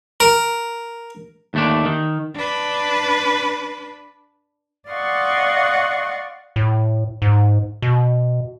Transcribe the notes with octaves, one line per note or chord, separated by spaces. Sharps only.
A#4
D#2 A3 D4
D#3
D4 B4
D5 D#5 F5 F#5 C6 C#6
A2
G#2
B2